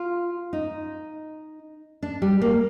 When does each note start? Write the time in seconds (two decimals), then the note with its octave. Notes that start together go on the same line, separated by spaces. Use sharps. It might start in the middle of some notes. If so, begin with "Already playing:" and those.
Already playing: F4
0.53 D#4
2.03 D4
2.22 G3
2.41 A#3